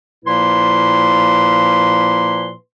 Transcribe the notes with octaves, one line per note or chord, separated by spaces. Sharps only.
A#2 F3 A#3 E4 B4 C6